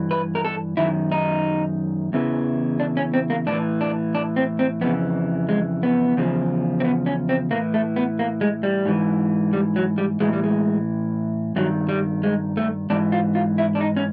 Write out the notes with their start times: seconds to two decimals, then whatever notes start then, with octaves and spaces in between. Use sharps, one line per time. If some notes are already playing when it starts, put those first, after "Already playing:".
Already playing: G2 E3
0.11 B4
0.35 A#4
0.45 A4
0.77 F#2 D#3 E4
1.12 D#4
2.13 E2 C#3 E3
2.80 D4
2.97 C#4
3.14 C4
3.30 A#3
3.47 A2 D4
3.52 E3
3.81 D4
4.15 D4
4.36 C4
4.59 C4
4.81 F2 C#3 E3 B3
5.49 G#3
5.83 B3
6.17 E2 C#3 F3
6.80 C4
6.84 B3
7.06 C#4
7.29 C4
7.51 A2 E3 A#3
7.74 A3
7.96 B3
8.19 A#3
8.41 G#3
8.63 G3
8.86 G#2 E3
9.53 G3
9.76 F#3
9.98 G3
10.20 A2 E3 G#3
10.33 G3
10.44 G#3
11.56 G2 D#3 F#3
11.89 G3
12.23 G#3
12.57 A3
12.90 G#2 E3 D4
13.12 F4
13.35 F4
13.58 E4
13.75 D4
13.81 D#4
13.97 C#4